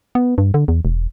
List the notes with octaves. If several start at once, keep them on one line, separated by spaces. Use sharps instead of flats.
B3
G2
D3
E2
E1